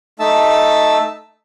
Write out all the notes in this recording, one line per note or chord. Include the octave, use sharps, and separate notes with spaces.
A3 D#4 E5 A5 E6